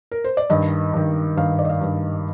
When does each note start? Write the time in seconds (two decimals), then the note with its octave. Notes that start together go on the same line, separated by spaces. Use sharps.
0.11 A#4
0.24 C5
0.37 D5
0.50 G2 D#3 D#5
0.93 G2 D#3
1.37 G2 D#3 F5
1.59 D5
1.65 D#5
1.69 F5
1.80 G2 D#3